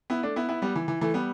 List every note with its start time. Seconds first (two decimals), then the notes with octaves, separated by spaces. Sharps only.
0.10 B3 E4
0.23 A3 D4
0.36 B3 E4
0.49 B3 E4
0.62 G3 B3
0.75 E3
0.88 E3
1.01 E3 A3
1.14 G3 B3